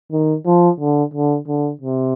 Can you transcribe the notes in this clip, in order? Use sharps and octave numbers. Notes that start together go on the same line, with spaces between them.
D#3
F3
D3
D3
D3
C3